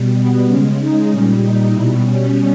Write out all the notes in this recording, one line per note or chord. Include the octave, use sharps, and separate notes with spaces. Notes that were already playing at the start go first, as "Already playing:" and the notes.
Already playing: B2 G3
B3
C#3 G#3 C#4
D#4
A#2 G3 C#4
D#4
B2 G3 E4
C#4